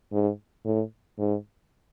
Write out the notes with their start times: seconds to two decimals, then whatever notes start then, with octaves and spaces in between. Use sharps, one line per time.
0.12 G#2
0.65 A2
1.18 G#2